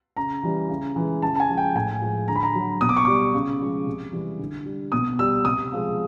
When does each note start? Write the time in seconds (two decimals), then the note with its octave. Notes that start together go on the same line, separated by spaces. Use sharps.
0.17 C#3 A#5
0.43 E3 G3
0.69 C#3
0.96 E3 G#3
1.22 C#3 A5
1.36 A5
1.40 G#5
1.49 F3 G#3
1.57 G5
1.75 A2 G#5
2.02 F3 G#3
2.28 D3 A#5
2.36 B5
2.43 A#5
2.55 F#3
2.81 B2 D#6
2.89 D6
2.97 C#6
3.05 G3 D6
3.34 C#3
3.60 F3 G#3
3.87 C3
4.12 E3 G3
4.39 D3
4.66 G3
4.92 B2 D#6
5.19 G3 E6
5.45 C3 D#6
5.72 F3 G#3